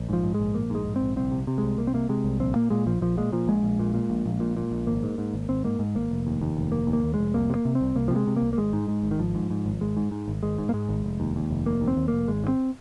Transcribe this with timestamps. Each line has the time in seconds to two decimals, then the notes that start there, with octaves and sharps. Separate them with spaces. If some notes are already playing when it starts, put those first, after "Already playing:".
Already playing: A#1
0.09 G#2 F3
0.23 G#2
0.34 G#3
0.40 A#1
0.54 A#1 A#3
0.70 G#2 G#3
0.85 G#2
0.96 C4
1.01 A#1
1.16 C2 C4
1.31 C3
1.47 C3
1.58 C2 G#3
1.78 C2 A#3
1.87 C4
1.94 C3 A#3
2.09 C3 G#3
2.24 C2
2.40 A#1 C4
2.55 A#2 A#3
2.70 A#2 G#3
2.86 A#1 F3
3.01 A#1 F3
3.17 A#2 G#3
3.32 A#2 F3
3.48 A#1 G#3
3.63 A#1
3.79 A#2
3.94 A#2
4.10 A#1
4.26 A#1
4.40 A#2
4.57 A#2
4.71 A#1
4.87 G#1 A#3
5.03 G#2
5.18 G#2
5.33 G#1
5.49 G#1 C4
5.64 G#2 A#3
5.79 G#2
5.95 G#1 A#3
6.11 F1
6.27 D#2
6.41 D#2
6.57 F1
6.72 F1 A#3
6.87 D#2
6.93 A#3
7.03 D#2
7.14 F1 G#3
7.34 C2 A#3
7.50 C3
7.55 A#3
7.65 C3
7.75 C4
7.81 C2
7.95 C2 A#3
8.08 F3
8.11 C3
8.16 G#3
8.27 C3
8.36 A#3
8.42 C2
8.53 A#3
8.57 G#1 G#3
8.73 G#2
8.88 G#2
9.03 G#1
9.11 D#3
9.19 G#1 F3
9.35 G#2
9.50 G#2
9.66 G#1
9.81 G#1 G#3
9.97 G#2
10.11 G#2
10.28 G#1
10.43 G#1 G#3
10.58 G#2
10.69 A#3
10.74 G#2 G#3
10.89 G#1
11.04 F1
11.20 D#2
11.36 D#2
11.50 F1
11.66 F1 A#3
11.81 D#2
11.87 C4
11.97 D#2
12.08 F1 A#3
12.27 G#1 G#3
12.44 G#2
12.48 C4